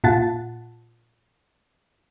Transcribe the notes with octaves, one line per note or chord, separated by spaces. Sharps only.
A#2 F4 F#5 A5 A6